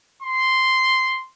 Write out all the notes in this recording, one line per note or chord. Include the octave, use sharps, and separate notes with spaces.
C6